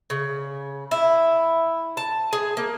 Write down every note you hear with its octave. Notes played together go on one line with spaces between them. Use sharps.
C#3
E4
A5
G#4
A#3